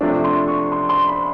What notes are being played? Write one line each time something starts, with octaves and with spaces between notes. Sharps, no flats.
C3 F3 A3 D4
C6
C#6
C6
C6
B5